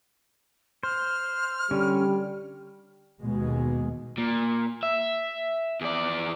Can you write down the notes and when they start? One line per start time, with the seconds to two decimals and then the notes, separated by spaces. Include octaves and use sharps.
0.83 C5 F6
1.71 D3 G3 C#4
3.22 D#2 B2 G#3
4.18 A#2
4.83 E5
5.81 E2 D5